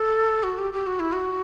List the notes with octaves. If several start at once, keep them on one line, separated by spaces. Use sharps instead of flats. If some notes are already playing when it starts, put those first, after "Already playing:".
Already playing: A4
F#4
G4
G4
F#4
E4
F#4